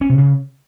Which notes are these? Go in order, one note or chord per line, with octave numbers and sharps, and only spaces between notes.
C#4
C3
C#3